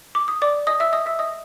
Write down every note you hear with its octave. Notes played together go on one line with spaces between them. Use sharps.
D6
D#6
D5 D6
D#5 D#6
E5 E6
D#5 D#6
E5 E6
D#5 D#6